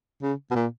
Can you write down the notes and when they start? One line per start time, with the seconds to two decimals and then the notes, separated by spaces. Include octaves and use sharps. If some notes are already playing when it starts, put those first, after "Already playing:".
0.22 C#3
0.51 B2
0.55 A#2